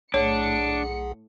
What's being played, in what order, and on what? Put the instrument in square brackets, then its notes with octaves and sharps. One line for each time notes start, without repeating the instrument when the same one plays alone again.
[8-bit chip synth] B1 G#4 F#5 [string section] A2 C#7 [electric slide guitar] D4 [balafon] C#5